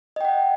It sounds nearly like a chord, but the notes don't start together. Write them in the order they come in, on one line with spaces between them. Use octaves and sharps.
D#5 G5 F#5